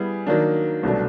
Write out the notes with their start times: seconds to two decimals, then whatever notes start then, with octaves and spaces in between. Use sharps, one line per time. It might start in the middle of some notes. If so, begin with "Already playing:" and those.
Already playing: G3 B3 E4 G#4
0.27 D#3 F#3 A#3 D4
0.83 C2 B2 F#3 A3 D4